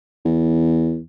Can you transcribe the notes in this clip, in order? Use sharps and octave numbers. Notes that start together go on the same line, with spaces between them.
E2